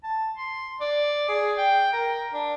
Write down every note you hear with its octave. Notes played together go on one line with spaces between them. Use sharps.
A5
C6
D5
G#4
G5
A#4
D4